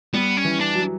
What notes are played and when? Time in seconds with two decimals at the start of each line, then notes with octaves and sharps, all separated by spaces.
0.14 G3 B3
0.37 C#4
0.45 E3
0.60 D4
0.75 F#3